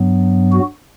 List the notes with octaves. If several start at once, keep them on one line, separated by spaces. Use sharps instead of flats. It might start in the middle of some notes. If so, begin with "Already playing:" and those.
Already playing: G2 F#3 B3
F#4